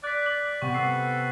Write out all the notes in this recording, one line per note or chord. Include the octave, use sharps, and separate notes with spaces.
D5 F#6 B6
D5 F#7
C3 B3 C4 C#6
A4 C7